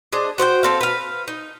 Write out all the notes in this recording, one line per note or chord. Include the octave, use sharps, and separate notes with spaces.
D4 G#4 C5 D#5
F#4 C5 D5 G5
A3 C4 F5
B4 F5
D#4